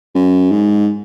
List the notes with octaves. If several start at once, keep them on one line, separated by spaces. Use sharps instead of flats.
F#2
G#2